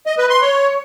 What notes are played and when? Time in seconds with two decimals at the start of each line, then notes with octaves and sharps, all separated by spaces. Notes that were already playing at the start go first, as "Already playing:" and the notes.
0.06 D#5
0.18 B4
0.30 C6
0.42 C#5